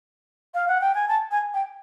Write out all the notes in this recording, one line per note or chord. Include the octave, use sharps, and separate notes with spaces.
F5
F#5
G5
G#5
A5
G#5
G5